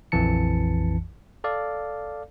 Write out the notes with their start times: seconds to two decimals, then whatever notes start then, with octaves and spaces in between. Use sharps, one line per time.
0.12 A#1 F2 E3 A5 C#7
1.44 A4 D5 F5